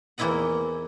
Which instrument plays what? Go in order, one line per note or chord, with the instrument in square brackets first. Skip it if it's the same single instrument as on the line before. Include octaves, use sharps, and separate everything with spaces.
[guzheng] E2 A#3 C4 E4 D#5 F#5